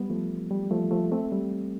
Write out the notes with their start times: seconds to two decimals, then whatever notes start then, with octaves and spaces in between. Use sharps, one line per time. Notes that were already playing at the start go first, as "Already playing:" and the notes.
Already playing: G3 B3
0.10 F3 A3
0.50 G3
0.71 F3 A3
0.91 F3 A3
1.12 A3 C4
1.32 G3